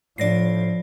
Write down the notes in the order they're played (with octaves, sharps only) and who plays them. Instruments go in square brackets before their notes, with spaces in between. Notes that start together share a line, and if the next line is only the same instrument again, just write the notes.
[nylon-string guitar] A2 D4 [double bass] F3 [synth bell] D5 A#6 C7